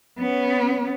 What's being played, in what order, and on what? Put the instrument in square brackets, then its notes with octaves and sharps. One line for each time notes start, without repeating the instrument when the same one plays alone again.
[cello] B3 C#4